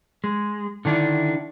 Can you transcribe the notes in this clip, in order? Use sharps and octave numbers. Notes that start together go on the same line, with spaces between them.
G#3
D3 D#3 D4 E4